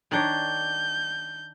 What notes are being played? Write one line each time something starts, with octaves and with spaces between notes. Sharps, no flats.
D#3 D4 C#5 G6